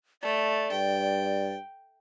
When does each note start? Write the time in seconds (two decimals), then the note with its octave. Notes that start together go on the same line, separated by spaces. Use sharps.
0.23 A3 D5
0.72 G2 G5